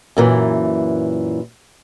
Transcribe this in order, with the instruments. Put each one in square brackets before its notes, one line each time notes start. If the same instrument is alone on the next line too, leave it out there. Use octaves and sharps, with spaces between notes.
[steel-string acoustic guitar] F#2 A#2 E3